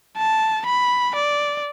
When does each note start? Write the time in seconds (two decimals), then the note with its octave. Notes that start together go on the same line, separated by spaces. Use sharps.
0.18 A5
0.67 B5
1.16 D5